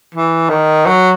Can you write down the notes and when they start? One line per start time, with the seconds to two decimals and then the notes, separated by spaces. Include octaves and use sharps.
0.14 E3
0.50 D#3
0.86 F#3